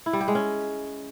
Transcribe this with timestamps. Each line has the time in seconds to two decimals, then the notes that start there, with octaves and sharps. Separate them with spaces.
0.06 E4
0.13 G3
0.21 G4
0.28 G#3
0.35 C#4